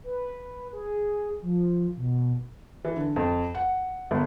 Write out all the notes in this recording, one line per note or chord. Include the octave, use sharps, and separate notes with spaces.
B4
G#4
F3
B2
E3
D3
F2
F#5
G1